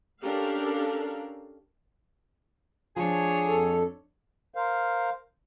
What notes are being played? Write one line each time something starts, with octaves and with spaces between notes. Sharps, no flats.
C#4 D4 G4 A4 A#4 F5
F3 D4 G#4 C#5
F2 A4
A#4 C5 F5